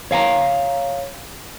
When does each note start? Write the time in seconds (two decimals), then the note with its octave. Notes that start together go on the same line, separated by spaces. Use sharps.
0.11 C#5 F5 G#5 A#5